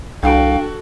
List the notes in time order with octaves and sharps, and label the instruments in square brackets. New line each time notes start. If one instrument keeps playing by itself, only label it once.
[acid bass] C2 [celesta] D4 G5 D7 [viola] F#4 A4 [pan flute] F5